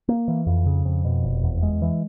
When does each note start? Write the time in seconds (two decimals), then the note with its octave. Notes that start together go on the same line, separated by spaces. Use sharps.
0.08 A#3
0.28 E3
0.47 F2
0.66 C#3
0.85 F2
1.05 B2
1.24 F1
1.43 E2
1.62 G#3
1.82 E3